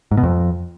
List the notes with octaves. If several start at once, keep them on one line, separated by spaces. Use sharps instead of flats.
G#2
B2
F2